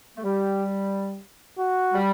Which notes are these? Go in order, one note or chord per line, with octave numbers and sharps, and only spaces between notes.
A3
G3 G4
F#4
G3